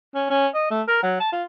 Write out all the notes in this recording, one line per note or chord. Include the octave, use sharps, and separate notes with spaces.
C#4
C#4
D#5
A3
A#4
F#3
A5
F4